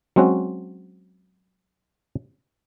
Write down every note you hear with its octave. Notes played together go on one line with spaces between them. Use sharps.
F#3 G#3 C4 C#4 F#4